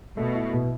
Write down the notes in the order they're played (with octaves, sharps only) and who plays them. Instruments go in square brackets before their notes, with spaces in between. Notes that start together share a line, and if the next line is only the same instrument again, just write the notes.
[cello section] B2 [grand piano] A3
[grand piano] E4
B2